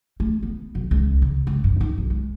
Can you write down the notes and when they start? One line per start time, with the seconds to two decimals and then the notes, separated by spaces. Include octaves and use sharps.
0.20 A3
0.43 B3
0.75 B1
0.91 C#2
1.22 C#3
1.47 C#2
1.64 G2
1.81 D#4
1.98 B1
2.10 G#3